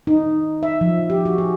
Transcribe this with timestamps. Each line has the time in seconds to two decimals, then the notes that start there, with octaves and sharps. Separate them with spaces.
0.07 D#4
0.63 E5
0.81 F3
1.10 G4
1.25 F#4
1.38 G#4